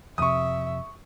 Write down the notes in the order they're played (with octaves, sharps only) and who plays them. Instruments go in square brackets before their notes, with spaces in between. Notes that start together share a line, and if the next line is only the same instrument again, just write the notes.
[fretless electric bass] F2 C3 [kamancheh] E5 [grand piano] C#6 D#6